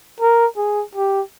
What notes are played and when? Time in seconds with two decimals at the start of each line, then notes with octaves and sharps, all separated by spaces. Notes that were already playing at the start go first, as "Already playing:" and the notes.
0.20 A#4
0.57 G#4
0.95 G4